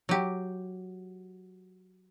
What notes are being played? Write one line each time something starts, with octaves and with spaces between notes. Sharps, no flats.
F#3 G4